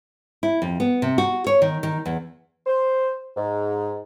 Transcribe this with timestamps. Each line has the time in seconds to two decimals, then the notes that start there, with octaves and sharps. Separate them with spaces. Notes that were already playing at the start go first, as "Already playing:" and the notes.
0.43 E4
0.62 F2
0.80 B3
1.02 C3
1.18 F#4
1.47 C#5
1.62 D#3
1.83 D#3
2.06 E2
2.66 C5
3.36 G#2